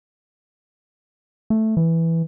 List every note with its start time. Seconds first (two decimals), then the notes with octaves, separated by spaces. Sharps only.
1.50 A3
1.77 E3